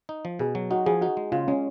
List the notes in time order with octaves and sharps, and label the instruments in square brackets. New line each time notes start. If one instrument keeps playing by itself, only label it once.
[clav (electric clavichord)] D#4
F3
[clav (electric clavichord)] B2 [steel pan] G#4
[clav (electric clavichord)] F#3
[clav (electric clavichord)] D#4 [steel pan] F#4
[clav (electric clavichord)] F3 [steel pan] G#4
[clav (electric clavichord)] D#4 [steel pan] F#4
[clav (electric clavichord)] G#3
[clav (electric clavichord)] C#3 [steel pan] F4
[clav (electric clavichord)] G#3 [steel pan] C#4